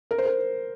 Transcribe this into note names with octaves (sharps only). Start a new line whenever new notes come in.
A#4
C5
A#4